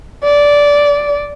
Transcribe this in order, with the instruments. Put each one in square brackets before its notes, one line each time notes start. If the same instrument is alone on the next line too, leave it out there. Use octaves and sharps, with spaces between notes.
[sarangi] D5